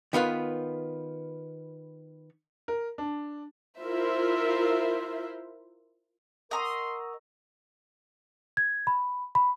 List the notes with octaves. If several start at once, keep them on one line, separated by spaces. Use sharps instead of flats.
D#3 B3 F4 B4
A#4
D4
E4 F4 A#4 C5 E5
A#4 D#5 F#5 A#5 C6 C#6 D#6 E6
G#6
B5
B5